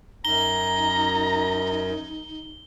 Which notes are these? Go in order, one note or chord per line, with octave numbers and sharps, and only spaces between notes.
F#2 D#4 A#5 G7